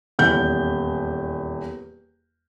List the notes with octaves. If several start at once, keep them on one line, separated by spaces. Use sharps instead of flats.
D#1 E2 G6